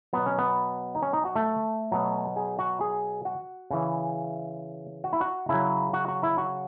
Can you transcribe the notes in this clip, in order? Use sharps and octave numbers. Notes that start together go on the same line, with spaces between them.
B2 F#3 B3
C#4
B3
D#4
C#4
D#4
F#4
A3
B2 F#3
G#4
F#4
G#4
F#4
C#3 E3
F#4
E4
F#4
C#3 F#3 E4
F#4
F#4
E4
F#4